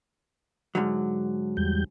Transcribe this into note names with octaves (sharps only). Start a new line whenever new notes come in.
G#2 D3 F#3
E2 G3 G6